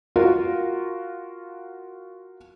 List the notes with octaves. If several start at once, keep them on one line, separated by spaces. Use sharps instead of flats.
F4 F#4 A#4